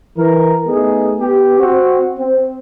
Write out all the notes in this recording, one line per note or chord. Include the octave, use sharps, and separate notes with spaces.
E3 A#4
A3 B3 D#4 G#4
B3 G4
C4 F#4
C4